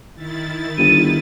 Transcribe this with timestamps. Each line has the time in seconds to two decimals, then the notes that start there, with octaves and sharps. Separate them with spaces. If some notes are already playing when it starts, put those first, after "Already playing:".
0.15 D#3 E4 A6
0.78 G1 D#7